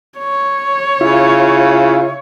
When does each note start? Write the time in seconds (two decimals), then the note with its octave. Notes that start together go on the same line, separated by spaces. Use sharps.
0.18 C#5
1.01 C#3 E4 F4